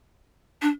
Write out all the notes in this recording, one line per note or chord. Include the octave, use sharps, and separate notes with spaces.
D4